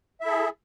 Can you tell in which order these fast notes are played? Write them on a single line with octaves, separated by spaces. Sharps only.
E5 E4 A4 G#4